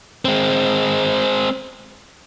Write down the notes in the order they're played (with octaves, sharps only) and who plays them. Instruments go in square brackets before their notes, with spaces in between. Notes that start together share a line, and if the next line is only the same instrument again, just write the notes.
[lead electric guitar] G#3 C4